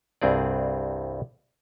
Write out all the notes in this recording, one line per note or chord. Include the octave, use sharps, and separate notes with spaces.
C2 G2 C4 G#4 D5